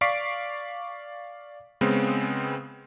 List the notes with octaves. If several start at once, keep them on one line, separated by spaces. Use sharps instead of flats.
D5 F5 C#6 B6 C7 D7
C#3 G#3 B3 C4